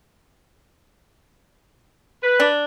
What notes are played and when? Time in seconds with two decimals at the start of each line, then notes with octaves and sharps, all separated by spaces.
2.22 B4
2.40 D4